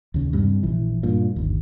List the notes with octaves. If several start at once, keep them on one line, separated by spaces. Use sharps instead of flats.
D#2 C#3
G2 C3 G3
A#1 E3
G2 A#2
G1 D#2